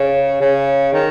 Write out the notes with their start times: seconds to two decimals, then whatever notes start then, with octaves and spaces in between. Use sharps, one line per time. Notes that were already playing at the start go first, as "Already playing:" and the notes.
Already playing: C#3
0.42 C#3
0.94 D#3